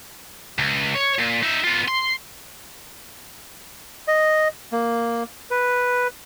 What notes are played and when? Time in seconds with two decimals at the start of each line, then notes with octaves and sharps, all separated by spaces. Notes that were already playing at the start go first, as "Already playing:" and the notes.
0.59 C#2
0.95 C#5
1.19 A#2
1.43 D#4 E5
1.64 B3 F4
1.88 C6
4.08 D#5
4.72 A#3
5.51 B4